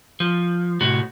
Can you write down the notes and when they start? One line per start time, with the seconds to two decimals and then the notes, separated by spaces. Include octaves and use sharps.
0.20 F3
0.81 A2 C3 F#4